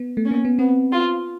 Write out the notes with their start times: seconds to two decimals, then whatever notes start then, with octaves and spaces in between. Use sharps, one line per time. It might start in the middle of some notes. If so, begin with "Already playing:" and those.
Already playing: B3
0.17 A3
0.26 C#4
0.31 A#3
0.45 B3
0.58 B3 C4
0.92 F4